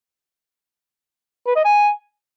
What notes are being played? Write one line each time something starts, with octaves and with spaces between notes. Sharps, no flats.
B4
D#5
G#5